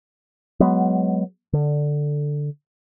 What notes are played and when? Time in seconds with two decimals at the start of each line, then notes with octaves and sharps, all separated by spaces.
0.60 F#3 G#3 B3
1.53 D3